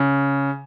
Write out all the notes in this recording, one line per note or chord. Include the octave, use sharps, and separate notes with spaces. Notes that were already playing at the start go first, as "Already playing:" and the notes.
Already playing: C#3